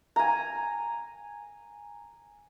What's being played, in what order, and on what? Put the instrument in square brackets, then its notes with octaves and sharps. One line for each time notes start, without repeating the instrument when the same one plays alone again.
[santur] G#5 A#5